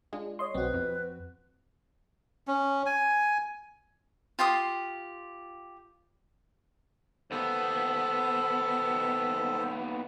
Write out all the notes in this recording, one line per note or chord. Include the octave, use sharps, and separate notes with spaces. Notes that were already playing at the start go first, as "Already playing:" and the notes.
G#3 D4 F4
C#5 D#5 C6
B1 C4 F#4 B4
F2
C#4
G#5
F4 G4 C6 D#6
D#2 B3 A4 C5